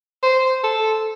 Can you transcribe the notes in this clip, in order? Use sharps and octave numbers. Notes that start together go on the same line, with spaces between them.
C5
A4